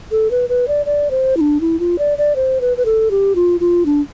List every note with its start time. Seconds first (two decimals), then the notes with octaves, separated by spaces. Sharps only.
0.11 A4
0.31 B4
0.49 B4
0.68 D5
0.86 D5
1.11 C5
1.37 E4
1.41 D4
1.61 E4
1.79 F4
1.99 D5
2.18 D5
2.36 C5
2.61 B4
2.77 B4
2.85 A4
3.11 G4
3.35 F4
3.60 F4
3.86 D4